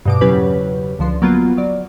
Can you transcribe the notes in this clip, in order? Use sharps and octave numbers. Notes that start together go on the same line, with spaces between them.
G2 B2 D6
E2 C#3 F#3 C#4 G4 B4
C#2 D3 F3 C6
F#3 A#3 B3 F4
F#3 D5